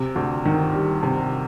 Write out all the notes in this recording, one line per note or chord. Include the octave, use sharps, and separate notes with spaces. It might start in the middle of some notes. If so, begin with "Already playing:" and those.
Already playing: C3
D2
D#3
G3
C3